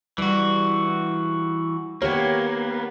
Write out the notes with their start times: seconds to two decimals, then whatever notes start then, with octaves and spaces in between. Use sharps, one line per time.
0.18 E3 G3 F#4
2.02 D#3 A#3 B3 G4 C#5